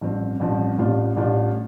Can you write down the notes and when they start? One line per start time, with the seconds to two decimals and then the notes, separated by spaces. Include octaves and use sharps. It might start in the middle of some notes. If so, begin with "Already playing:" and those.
0.01 A1 G2 F3 C4
0.40 A1 G2 F3 C4
0.78 A1 A2 G3 D4 F4
1.16 A1 A2 G3 D4 F4